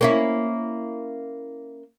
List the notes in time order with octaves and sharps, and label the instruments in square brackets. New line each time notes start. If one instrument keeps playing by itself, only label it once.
[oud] A#3 C#4 E4